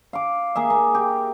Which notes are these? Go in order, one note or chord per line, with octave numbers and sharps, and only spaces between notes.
F5 D6
A#3 G#4 E5
A#3
G4